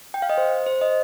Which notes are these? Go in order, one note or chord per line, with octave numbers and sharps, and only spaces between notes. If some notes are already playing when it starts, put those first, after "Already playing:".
G5
F5
D#5
C5
C5
D#5